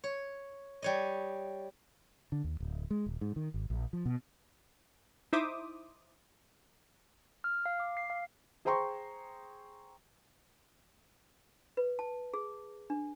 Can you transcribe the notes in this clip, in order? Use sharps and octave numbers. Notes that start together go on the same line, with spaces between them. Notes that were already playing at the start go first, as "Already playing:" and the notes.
C#5
G3 C#5 D#5
D3
D#2
D1
G#3
D#1
G#2
D#3
G#1
A#1
F3
B2
D#4 E4 C5 E5 D6 D#6
F6
F5
D6
C7
F5
G#4 C5 G5 A#5 C6 C#6
B4
A5
G#4
D4